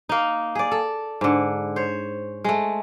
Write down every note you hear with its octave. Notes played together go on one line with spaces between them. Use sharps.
A#3 D#4
G#4 D5
A4
G#2 D3
C5 C#5
G#3 A3